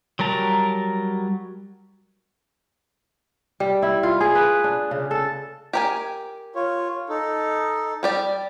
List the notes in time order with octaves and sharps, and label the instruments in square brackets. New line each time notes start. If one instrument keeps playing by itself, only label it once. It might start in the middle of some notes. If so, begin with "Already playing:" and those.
[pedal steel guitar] F#3 G3 A#4 A5 A#5
[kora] G3
E4
F4
G#4
B4
D4
C#3
A4
[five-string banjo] G4 A#4 G#5
[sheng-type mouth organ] F4 C#5
D#4 A4
[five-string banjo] G3 G4 D5